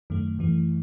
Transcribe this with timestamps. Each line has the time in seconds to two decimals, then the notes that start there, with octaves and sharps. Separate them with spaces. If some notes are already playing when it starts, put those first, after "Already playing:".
0.10 F#2 D#3 A3
0.39 F#2 E3 A3